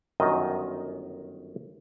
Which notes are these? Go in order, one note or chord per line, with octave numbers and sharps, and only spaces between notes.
G1 F#2 D#3 D#5